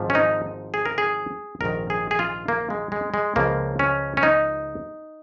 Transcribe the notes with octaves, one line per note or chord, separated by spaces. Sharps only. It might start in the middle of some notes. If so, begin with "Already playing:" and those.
Already playing: G#1 G#2 F3
C#4
D#4
G#4
A#4
G#4
A#1 G#2 D#3 A#4
G#4
G#4
F4
A#3
G#3
G#3
G#3
C#2 C#3 F3 A#3
C#4
C#4
D#4